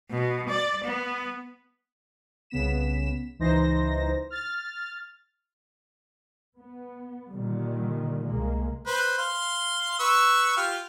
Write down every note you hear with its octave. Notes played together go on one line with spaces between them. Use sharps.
B2
D5
B3
C2 C#3 B3 B6 E7
C#2 E3 D#4 C5 A#6
F6 A6
B3
A#2 D3 D#3 G3
C2 G#3 A#3
B4 C5
F5 C6
B4 C#6 E6
F4 G4 F6